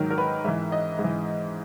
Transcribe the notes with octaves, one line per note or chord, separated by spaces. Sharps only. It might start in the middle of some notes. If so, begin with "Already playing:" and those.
Already playing: G#2 D#3 F#3 A#4
A#4
B4
G#2 E3 E5
D#5
G#2
E3